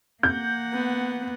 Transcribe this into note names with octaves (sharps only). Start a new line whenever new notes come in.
A#3 F#5 G6
B3